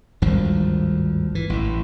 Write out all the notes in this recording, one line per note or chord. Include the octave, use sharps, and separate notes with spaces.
G#1 D2 G2 F3
E3
A1 A2